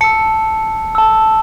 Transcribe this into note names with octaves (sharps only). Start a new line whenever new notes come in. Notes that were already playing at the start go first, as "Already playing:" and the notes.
A5 E6 C#7
A5 E6